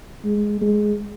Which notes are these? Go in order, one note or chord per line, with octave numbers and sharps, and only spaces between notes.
G#3
G#3